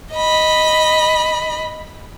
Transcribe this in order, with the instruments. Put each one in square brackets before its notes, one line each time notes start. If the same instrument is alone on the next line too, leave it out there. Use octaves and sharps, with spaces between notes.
[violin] D#5 B5